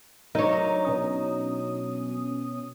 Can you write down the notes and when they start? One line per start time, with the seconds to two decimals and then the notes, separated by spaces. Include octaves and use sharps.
0.35 F#3 D4 D#4 A#4 C#5
0.85 B2 C#4 D#6